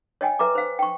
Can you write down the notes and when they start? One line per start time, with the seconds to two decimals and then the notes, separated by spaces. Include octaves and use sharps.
0.21 C#5 D#5 G5 G#5
0.39 B4 E5 A#5 D6
0.55 C5 F5
0.79 G5 C#6